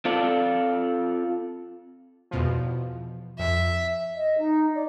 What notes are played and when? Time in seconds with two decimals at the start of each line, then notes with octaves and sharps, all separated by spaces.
0.05 C4 F4 A4 D5
2.31 E2 B2 F3
3.39 F2 E5
4.15 D#5
4.38 D#4
4.75 D5